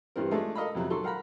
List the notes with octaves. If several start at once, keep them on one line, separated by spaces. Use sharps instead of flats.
G2 E3 G3 C4 A#4
G#3 A3 D4 F4 G#4 A4
A4 A#4 D#5 F5 A#5 B5
F2 C3 F#3
D#3 F#3 A4 C6 C#6
A#4 F5 F#5 A#5 B5